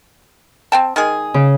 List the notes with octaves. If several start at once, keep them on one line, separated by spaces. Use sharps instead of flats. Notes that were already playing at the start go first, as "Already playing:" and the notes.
C4 G5 A5
D#3 G#3 G#4
C#3